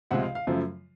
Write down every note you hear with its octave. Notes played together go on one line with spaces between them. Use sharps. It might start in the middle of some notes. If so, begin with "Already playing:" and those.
C#2 C3 F3 G#3 E5 F#5
F5
F5
F#2 C#3 F3 A3